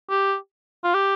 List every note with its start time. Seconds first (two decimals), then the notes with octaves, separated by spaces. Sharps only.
0.10 G4
0.84 F4
0.94 G4